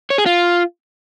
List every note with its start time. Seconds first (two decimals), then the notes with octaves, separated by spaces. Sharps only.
0.10 C#5
0.18 G#4
0.26 F4